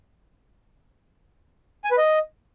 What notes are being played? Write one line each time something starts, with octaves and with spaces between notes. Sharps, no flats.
G#5
B4
D#5